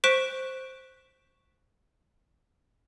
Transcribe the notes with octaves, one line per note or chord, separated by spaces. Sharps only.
C5 C#6 F#6 B6 D7 E7